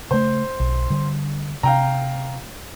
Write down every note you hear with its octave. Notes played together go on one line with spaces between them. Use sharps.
C#3 A3 C5
B1
D3 G3
C3 F5 G5 A#5